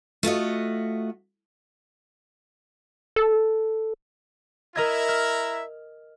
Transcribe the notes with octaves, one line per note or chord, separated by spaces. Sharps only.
A3 F4 F#4 D#5
A4
E4 A#4 D#5 E5 A#5 G#6
F6